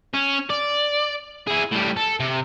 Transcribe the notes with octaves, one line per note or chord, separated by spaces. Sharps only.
C#4
D5
E4 G#4
A2 G3
A4
C3